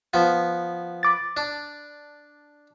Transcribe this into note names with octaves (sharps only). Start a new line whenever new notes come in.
F3 B3
B5 D6 A6
D4